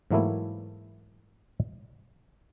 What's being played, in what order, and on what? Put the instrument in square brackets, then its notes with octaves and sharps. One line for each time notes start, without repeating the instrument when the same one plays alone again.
[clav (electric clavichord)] G#2 E3 F#3 A3 A#3 E4